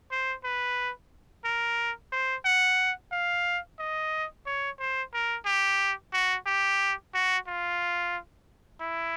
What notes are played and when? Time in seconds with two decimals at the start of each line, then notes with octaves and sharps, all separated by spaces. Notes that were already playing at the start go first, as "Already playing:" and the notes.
0.11 C5
0.44 B4
1.45 A#4
2.12 C5
2.45 F#5
3.12 F5
3.79 D#5
4.46 C#5
4.79 C5
5.13 A#4
5.46 G4
6.13 F#4
6.46 G4
7.14 F#4
7.47 F4
8.81 E4